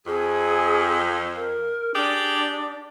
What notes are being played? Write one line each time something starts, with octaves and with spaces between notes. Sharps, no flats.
F2 G#4
A#4
D4 G4 G#4 D5